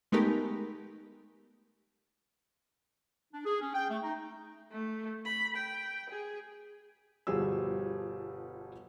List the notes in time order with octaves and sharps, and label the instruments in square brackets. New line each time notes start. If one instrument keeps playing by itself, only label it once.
[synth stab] G#3 A3 B3 D#4 G4 A#4
[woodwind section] D4
G#4
C#4
G5
A3
D#4
[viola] A3
B5
G5
G#4
[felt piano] G1 B2 F3 G3 G#4 E6